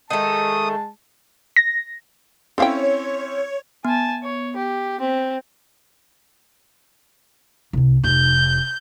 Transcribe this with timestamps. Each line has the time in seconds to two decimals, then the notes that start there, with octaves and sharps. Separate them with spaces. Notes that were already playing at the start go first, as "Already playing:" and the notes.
0.10 D#3 G#3 A3 A5 D#6
1.56 A#6
2.58 C4 C#4 E4 A4 C#5 F5 G5
3.85 B3 G#5 A5
4.23 C#5
4.56 G4
5.00 C4
7.73 C2 C3
8.03 F1 G6